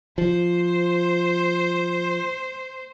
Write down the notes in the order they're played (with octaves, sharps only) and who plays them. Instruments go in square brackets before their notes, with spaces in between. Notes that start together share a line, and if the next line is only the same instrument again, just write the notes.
[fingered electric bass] F3 [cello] C5